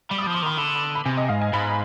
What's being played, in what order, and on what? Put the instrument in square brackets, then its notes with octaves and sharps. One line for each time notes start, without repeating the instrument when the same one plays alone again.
[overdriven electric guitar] G3 [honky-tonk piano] B5
[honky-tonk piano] D#6
D6
[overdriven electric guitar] F3
[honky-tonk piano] C6
[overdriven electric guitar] D#3 [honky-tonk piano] B5
[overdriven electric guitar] D3 [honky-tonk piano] B5
[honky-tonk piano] B5
[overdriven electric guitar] C3 [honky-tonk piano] G#5
[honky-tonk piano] D#5
[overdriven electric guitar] G#2 [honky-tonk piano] F5
[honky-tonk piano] G#5
[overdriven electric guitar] G#2 [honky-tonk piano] B5